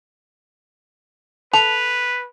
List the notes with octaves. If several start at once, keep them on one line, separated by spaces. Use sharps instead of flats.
A4 B4 F7